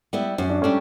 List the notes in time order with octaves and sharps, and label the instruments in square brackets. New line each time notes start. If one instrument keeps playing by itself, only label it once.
[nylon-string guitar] G3 B3 E4
[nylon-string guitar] F#2 [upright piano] C#4
[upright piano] D4
[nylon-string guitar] G3 D4 [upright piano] A3 C#4